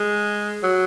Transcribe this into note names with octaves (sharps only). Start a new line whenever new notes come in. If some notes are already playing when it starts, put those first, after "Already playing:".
Already playing: G#3
F#3